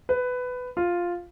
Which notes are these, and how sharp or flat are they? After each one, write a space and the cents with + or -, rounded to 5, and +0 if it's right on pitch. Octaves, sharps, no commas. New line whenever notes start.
B4 +15
F4 +0